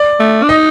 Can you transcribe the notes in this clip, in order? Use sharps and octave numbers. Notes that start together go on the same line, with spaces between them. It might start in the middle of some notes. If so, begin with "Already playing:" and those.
Already playing: D5
A3
D4
D#4 D#5